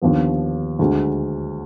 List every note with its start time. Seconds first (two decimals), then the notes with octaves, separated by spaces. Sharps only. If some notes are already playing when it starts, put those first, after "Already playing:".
0.02 D#2 D3 F3 B3
0.79 D2 D3 G#3